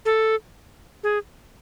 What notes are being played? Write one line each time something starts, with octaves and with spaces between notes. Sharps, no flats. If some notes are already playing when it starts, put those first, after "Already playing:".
A4
G#4